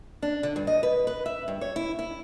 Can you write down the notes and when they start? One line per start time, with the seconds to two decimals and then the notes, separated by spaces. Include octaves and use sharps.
0.22 D4
0.43 D3
0.56 G2
0.67 D#5
0.83 B4
1.07 B4
1.26 E5
1.48 G2
1.61 C#5
1.76 E4
1.99 E4